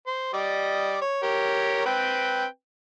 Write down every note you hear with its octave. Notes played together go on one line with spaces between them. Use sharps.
C5
G3 D5 D#5
C#5
G4 A#4 C#5
C4 B4 G5